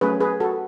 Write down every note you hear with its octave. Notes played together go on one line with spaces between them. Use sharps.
F#3 A3 C#4 G#4 B4
G#4 B4
F#4 A4